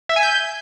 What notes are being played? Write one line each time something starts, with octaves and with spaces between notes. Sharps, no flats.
E5
G#5
G6